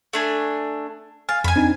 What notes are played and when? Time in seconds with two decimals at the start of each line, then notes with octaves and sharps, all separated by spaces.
0.13 A3 D4 G#5
1.29 F5 G#5 A6
1.44 F2 G#5 B5
1.56 C4 D4 D#4